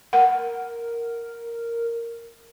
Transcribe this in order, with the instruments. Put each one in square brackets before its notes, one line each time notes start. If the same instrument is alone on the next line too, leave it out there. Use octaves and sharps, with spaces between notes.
[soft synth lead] A#4 [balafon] F#5